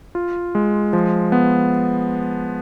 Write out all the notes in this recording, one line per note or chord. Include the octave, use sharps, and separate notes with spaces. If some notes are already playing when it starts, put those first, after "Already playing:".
F4
G#3
F3
B3